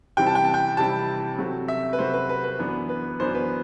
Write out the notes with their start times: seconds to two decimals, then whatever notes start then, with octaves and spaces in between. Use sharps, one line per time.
0.17 C3 E3 G3 C4 E4 G5
0.27 A5
0.35 G5
0.44 A5
0.54 G5
0.77 C3 E3 G3 C4 E4 A5
1.38 C3 F#3 A3 C4 F#4
1.68 E5
1.93 B4
1.99 C3 F#3 A3 C4 F#4 C5
2.14 B4
2.29 B4
2.44 B4
2.59 F#2 E3 B3 D4
2.89 B4
3.20 F#2 E3 B3 D4 C5
3.35 B4